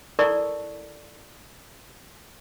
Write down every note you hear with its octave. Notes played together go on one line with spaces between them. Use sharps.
E4 A4 A#4 D5 A5 C#6